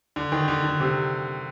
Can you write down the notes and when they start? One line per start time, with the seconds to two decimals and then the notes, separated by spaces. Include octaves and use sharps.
0.16 D3
0.32 D#3
0.48 D3
0.64 D3
0.80 C3